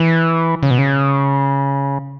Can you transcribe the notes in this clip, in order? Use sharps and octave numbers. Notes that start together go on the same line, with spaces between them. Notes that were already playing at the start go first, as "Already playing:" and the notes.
Already playing: E3
C#3
B2
C#3